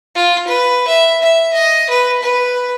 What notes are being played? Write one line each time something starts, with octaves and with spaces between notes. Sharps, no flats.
F4
B4
E5
E5
D#5
B4
B4